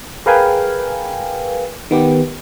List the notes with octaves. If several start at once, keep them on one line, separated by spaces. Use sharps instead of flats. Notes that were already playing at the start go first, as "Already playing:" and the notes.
G#4 A#4 B4 F5 G5 G#5
D#3 B3 G4